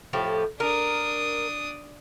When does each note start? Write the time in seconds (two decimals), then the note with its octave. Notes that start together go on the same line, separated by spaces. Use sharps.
0.13 A2 F3 G4
0.60 D4 A#4 D#6